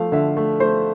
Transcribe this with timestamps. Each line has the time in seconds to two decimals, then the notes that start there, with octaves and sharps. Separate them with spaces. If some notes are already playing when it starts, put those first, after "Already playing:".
Already playing: F3 A3 F5
0.12 D3 E5
0.37 A3
0.60 A3 C5